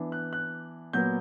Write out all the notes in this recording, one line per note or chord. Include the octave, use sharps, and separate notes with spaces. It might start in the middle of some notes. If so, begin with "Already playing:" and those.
Already playing: E3 B3 D4
F#6
F#6
A#2 F#3 B3 G6